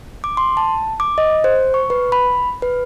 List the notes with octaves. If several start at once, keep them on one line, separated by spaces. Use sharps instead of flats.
D6
C6
A5
D6
D#5
C5
C#6
B4
B5
B4